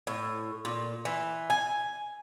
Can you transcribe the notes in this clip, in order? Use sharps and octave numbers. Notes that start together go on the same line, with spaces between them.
A2
A#2
E3
G#5